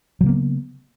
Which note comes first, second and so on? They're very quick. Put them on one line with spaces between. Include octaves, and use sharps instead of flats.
F#3 C#3 A#3 B3